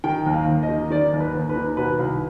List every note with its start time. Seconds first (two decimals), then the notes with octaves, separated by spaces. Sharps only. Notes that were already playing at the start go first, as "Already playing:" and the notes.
0.04 D#3 G5
0.26 D#2
0.33 F5
0.47 D#2
0.63 D#5
0.69 D#3
0.90 D#3 D5
1.13 D#2
1.20 B4
1.34 D#2
1.49 B4
1.56 D#3
1.77 B2 B4
1.99 C2